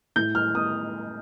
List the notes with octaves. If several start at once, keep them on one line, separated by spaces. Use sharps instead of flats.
A2 G6
F6
A2 D#6